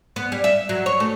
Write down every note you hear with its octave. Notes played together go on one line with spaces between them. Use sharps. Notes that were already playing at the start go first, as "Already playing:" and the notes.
B3
G3
E5
F#3
C#5
A3